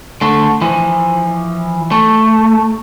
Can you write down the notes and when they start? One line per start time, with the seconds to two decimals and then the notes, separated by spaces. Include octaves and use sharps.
0.21 D3 A3
0.61 E3 F3
1.91 A3